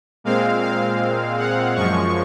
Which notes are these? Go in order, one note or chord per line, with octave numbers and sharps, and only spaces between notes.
A#2 G#3 C4 F5
F5
F#5
F#2 F3 G#3 C#6